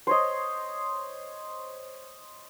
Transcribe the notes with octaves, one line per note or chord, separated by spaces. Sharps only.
C5 C#5 D#5